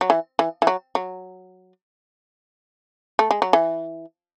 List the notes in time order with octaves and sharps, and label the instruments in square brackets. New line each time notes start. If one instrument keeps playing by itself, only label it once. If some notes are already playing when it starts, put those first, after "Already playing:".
[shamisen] F#3
E3
E3
E3
F#3
F#3
A3
G#3
F#3
E3